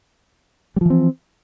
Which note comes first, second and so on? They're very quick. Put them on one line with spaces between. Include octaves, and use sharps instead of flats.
G3 F3 E3 C4